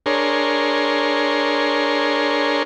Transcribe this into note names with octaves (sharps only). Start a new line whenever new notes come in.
D4 G#4 A#4 C#5 C6